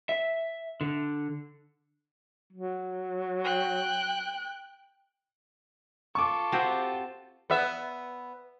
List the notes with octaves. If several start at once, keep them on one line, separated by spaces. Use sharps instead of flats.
E5
D3
F#3
G5 F#6
F4 A4 C#6 D6
C4 F#4 G4
B3 E5